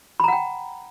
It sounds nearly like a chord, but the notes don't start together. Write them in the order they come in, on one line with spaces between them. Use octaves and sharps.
B5 A#5 F#5 G5